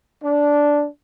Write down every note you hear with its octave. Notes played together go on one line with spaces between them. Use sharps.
D4